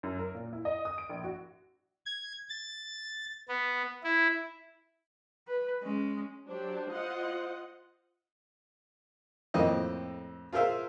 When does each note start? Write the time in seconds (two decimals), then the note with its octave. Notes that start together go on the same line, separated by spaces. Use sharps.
0.03 F#2
0.19 A#4
0.34 A#2
0.53 E4
0.65 D#5
0.85 D#6
0.98 D7
1.10 A#1
1.24 F#4
2.06 G#6
2.49 A6
3.48 B3
4.04 E4
5.48 B4
5.82 G#3 C#4
6.48 F#3 D4 G4 C5
6.90 F4 D#5 F#5
9.54 F2 A2 A#3 C4 D#5
10.53 F4 G#4 A#4 C5 E5 F5